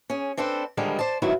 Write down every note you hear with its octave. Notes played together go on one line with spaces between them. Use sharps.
C#4 G#4
C4 D4 A4 B4 C5
D3 D#3 F3 G3 G#3 A#4
C5 D5 A5
G#2 D#3 E3 F#3 E4 F#4